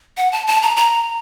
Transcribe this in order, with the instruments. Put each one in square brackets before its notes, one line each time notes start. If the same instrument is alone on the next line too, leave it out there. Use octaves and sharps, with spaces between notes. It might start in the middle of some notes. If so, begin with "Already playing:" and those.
[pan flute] F#5
A5
A5
A#5
A#5